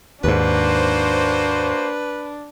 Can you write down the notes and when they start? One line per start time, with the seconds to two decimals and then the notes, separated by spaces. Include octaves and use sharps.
0.24 D#2 G#2 A#3 D4 F#4 B4 C5